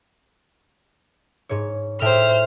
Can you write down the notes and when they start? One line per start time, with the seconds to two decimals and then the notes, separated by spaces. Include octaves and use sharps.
1.49 G#2 C#5
2.01 A2 C5 E5 G5 F6